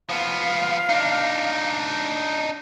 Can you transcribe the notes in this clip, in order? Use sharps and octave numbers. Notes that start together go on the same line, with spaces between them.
F3 B3 F5
D4 D#4